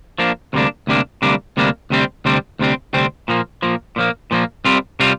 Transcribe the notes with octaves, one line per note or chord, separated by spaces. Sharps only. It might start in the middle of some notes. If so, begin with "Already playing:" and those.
F3 A#3 D4
D2 C3 G3 A#3 D4
D2 C3 G3 A#3 D4
D2 C3 G3 A#3 D4
D2 C3 G3 A#3 D4
D2 C3 G3 C4
D2 C3 G3 C4
D2 C3 G3 C4
D2 C3 G3 C4
A#2 F3 A#3
A#2 F3 A#3
A#2 F3 A#3
A#2 F3 A#3
C2 C3 G3 C4 F4
C3 G3 C4 F4